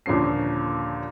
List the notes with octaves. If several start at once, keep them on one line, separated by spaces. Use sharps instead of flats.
D#2 A#2 D3 F3 C#4 C7